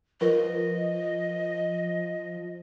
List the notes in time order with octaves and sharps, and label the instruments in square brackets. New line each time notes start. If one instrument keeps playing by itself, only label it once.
[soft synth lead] F3 [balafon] F4 A#4 B4 [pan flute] D#5